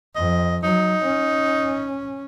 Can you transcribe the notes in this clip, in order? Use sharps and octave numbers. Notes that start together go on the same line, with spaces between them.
F2 D#5
F#3 D#4
C#4